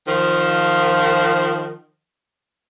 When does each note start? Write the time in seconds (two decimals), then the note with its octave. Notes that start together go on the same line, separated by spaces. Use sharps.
0.08 D#3 F3